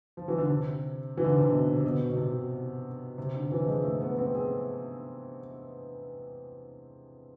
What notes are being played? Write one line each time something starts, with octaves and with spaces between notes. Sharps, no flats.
F3
E3
D3
C3
E3
D3
C3
D3
B2
C3
B2
B2
C3
C3
D3
E3
F3
G#3
A3
B3
C4
G#4